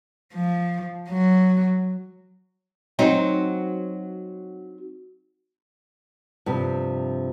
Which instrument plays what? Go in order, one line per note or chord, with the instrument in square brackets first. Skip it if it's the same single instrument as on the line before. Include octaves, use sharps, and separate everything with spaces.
[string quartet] F3
F#3
[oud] F#3 C4 D#4
[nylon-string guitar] G2 C3 F3